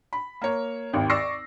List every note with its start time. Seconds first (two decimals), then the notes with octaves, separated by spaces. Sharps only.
0.13 B5
0.41 A#3 C#5
0.93 G#1 D#2
1.10 D5 C#6 D6 E6 A#6 C7